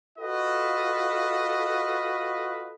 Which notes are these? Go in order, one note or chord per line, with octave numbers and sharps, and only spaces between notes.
F4 F#4 A4 B4 D#5